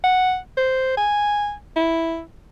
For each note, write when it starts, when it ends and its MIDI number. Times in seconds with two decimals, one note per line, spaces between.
0.04 0.37 78
0.57 0.95 72
0.97 1.53 80
1.76 2.21 64